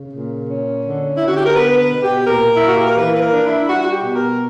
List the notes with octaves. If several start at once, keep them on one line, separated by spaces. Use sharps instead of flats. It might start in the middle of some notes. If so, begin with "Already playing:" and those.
Already playing: C#3
A#2
C#4
D3
D3 E4
F#4
G4
A#4
B3 B4
B4
B2
G4
A#2 A#4
E4
A#3
F#4
G4
A#4
E3 B4
B4
A#4
D4
E4
G3 F#4
F#4
G4
B2
A#4